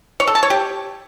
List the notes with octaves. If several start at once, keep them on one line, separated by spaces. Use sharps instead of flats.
C#5
A4
A5
C#5
G4